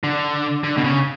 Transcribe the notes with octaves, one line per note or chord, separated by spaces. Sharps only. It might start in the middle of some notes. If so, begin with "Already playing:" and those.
D3
D3
B2
C#3